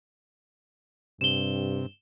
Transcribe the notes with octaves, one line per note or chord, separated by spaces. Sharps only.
G2 C3 E7 G7